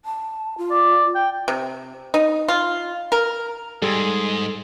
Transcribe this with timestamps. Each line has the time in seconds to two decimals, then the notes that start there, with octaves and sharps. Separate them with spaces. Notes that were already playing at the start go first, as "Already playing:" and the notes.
0.05 A5
0.58 F4
0.71 D5
1.15 G5
1.48 C3
2.14 D#4
2.48 F4
3.12 A#4
3.82 G#2 G3 G#4 A4 C6